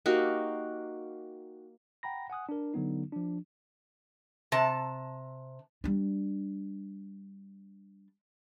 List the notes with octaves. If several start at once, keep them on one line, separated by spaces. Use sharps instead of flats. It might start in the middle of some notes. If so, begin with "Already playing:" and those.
A#3 D#4 F#4 G4
F#5 G5 A#5 B5 A#6
F#5 G#5 D#6 F#6
D4 A#4
D3 F#3 B3 D#4
F3 D4
C3 A5
G3 D4